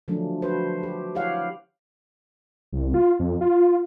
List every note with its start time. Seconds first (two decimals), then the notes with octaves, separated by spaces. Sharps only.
0.08 D3 F3 F#3 A3 C#4 D4
0.42 F#4 B4 C5
0.83 G4
1.15 E4 G4 C#5 F5 F#5
2.73 C2
2.94 F4
3.20 F2
3.41 F4